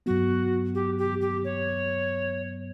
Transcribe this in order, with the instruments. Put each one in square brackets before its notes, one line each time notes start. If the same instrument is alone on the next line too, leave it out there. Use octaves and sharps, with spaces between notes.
[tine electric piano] G2 F#3 B3 [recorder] F#4
[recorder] G4
G4
G4
C#5